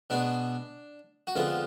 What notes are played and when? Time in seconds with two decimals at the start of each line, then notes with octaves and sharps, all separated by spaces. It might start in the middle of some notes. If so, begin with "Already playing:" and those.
0.10 B2 G#3 B3 D4
1.27 F#4
1.36 F2 D3 G#3 B3 F4